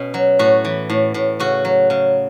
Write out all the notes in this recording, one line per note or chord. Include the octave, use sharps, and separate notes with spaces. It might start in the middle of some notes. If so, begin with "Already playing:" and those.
Already playing: B2 C#4
F#3
A2 F#4
E3
A2
A2
C#3 F#4
F#3
C#3